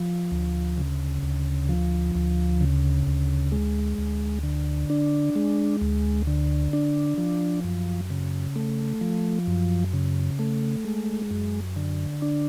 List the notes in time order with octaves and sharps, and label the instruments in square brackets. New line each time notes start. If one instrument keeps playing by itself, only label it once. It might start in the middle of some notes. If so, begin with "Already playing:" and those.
Already playing: [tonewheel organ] F3
D2
C#3
D2
F3
D2
C#3
D2
G#3
D2
D3
D4
G#3
D2
D3
D4
F3
F#2
C#3
A3
F3
F#2
C#3
A3
G#3
F#2
D3
D4